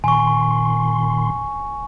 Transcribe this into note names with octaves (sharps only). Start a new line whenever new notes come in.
A#2 D#3 G#5 C6 C#6